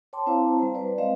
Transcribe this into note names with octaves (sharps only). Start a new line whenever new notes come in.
C#5 G5 A5 C6 D6
C4 E4 C5 F5 A5 A#5
G3 C5
B4 C5 D5
G#3 C4 C5 D#5 F5